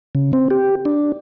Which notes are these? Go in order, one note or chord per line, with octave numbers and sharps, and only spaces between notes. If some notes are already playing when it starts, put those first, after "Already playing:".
C#3
C4
G4
D4